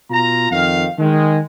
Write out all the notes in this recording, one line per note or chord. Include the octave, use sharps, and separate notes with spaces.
B2 F4 A#5
F2 D#3 F5
D#3 G#3